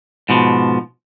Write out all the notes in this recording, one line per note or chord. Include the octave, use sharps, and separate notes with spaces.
G#2 B2 F3